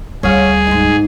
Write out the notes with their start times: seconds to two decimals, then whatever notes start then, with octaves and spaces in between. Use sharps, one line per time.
0.23 D2 G3 C#4 G#4 F5
0.67 G#2 D#4